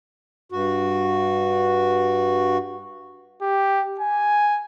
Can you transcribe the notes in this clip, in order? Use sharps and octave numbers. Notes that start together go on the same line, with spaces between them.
G2 F#4
G4
G#5